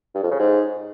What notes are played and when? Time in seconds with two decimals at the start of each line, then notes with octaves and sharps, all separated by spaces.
0.15 G2
0.23 F2
0.31 C#3
0.39 G#2